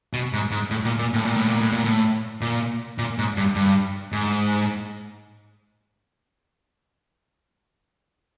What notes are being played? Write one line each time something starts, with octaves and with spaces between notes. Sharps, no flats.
B2
G#2
G#2
A2
A#2
A#2
A2
A#2
A2
A#2
A2
A#2
A2
A#2
A#2
G#2
G2
G2
G#2